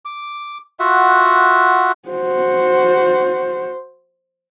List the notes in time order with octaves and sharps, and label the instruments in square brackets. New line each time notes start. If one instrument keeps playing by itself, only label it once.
[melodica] D6
F4 F#4 E5 F#5
[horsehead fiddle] F#4 C5